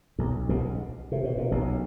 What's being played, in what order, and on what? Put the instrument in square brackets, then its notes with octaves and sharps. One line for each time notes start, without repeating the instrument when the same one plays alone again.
[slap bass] B1 B2
B1 B2
C3
B2
A#2
B1 B2